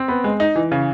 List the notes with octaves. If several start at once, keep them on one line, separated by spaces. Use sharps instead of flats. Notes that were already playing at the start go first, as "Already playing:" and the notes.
Already playing: C4
B3
G#3
D#4
E3
C#3